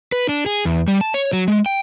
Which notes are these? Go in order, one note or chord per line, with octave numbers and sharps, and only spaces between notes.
B4
D4
G#4
E2
G3
A5
C#5
F#3
G#3
G5